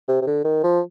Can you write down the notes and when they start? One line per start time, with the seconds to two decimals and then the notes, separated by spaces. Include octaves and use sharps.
0.08 C3
0.22 C3
0.27 D3
0.45 D#3
0.64 F3